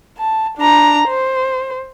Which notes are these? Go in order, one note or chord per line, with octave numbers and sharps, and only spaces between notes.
A5
D4 A#5
C5